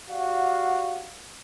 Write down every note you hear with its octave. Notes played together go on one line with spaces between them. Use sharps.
F#4 G4 D5 F5 F#5